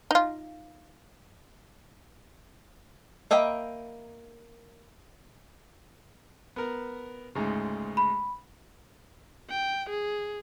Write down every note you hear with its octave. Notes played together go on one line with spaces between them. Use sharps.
D#4 F4
A#3 D#5 E5 G5 B5
B3 A#4
D2 G#2 C#3
B5
G5
G#4